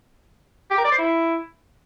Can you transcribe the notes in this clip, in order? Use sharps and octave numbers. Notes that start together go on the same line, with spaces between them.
G4
A#4
D5
C5
E4